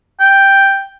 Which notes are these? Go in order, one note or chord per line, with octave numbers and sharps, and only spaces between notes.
G5